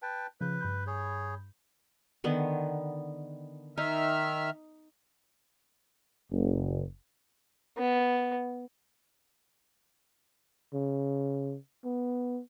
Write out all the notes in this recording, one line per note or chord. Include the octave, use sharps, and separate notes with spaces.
B4 G5 A5
C#3 F3 B4 G6
G2 B5 G6
G#4 C#5
D3 D#3 B3
D#3 D#4 E5 F6
F#1
B3
C#3
B3